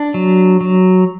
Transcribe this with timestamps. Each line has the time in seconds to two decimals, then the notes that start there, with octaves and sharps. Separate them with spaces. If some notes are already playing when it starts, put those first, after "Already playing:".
Already playing: D4
0.14 F#3
0.61 F#3